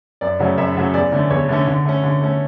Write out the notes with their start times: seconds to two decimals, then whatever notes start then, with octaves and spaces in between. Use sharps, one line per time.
0.21 F#2 D5
0.39 C#3 F#3 A3 C#4
0.58 F#2 E5
0.76 C#3 F#3 A3 C#4
0.94 E2 D5
1.12 D3 A3 C#4
1.30 E2 C#5
1.49 D3 A3 C#4
1.67 D3
1.85 A3 C#4
2.03 D3
2.21 A3 C#4